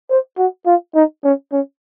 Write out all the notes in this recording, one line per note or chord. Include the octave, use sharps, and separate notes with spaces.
C5
F#4
F4
D#4
C#4
C#4